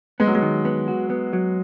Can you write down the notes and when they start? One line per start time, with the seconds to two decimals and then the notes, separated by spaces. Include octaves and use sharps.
0.20 G#3 B3
0.27 F#3
0.35 G#3
0.42 D#3
0.65 B3
0.88 F#4
1.10 B3
1.33 F#3